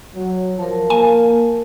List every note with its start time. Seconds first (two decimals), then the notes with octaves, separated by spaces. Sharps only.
0.15 F#3
0.58 F3 A#4 A5
0.90 A#3 G#5